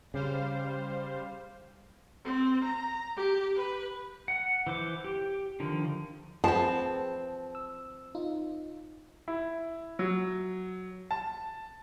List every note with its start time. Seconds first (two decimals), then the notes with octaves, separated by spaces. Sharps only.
0.14 C#3 G3 C5 F5
2.25 C4
2.65 A#5
3.17 G4
3.56 B4
4.28 F#5
4.67 E3 C5 D6
5.04 G4
5.60 D3 D#3 F3
6.44 F3 C4 G#4 B4 A5
7.55 E6
8.15 D#4 F4
9.28 E4
9.99 F#3
11.11 A5